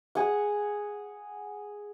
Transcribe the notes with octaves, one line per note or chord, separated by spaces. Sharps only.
G#4 F#5